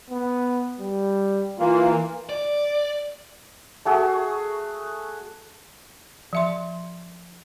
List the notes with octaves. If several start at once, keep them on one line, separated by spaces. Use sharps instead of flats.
B3
G3
E3 A#3 F4
D5
A3 F#4 G#4
F3 E5 C6